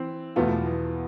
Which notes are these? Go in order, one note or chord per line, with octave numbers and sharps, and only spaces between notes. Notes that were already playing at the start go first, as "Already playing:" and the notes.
Already playing: E3 C4
E2 B2 A3 B3 F4
F3
E3